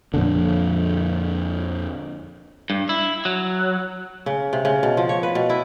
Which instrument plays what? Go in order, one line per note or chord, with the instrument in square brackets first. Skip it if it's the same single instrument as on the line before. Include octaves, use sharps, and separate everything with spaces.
[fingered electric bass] F2 A#2 D3
[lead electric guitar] G2
E4
F#3
[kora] C#3
C3
C#3
B2
F3
C#5
B4
B2
E4